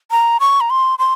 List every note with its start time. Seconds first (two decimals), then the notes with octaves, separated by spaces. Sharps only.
0.11 A#5
0.40 C#6
0.61 A#5
0.70 C6
0.99 C6